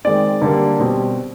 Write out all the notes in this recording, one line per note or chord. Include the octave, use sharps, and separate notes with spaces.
D#3 G#3 C4 D5
D3 G3 A#3
B2 G3 C4